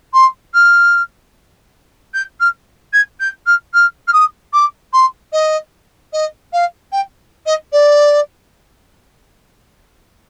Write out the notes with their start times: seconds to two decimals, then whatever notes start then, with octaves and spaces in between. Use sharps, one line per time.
0.13 C6
0.54 F6
2.14 G6
2.40 F6
2.93 G#6
3.20 G6
3.46 F6
3.73 F6
4.07 F6
4.13 D#6
4.53 D6
4.93 C6
5.33 D#5
6.13 D#5
6.53 F5
6.92 G5
7.46 D#5
7.72 D5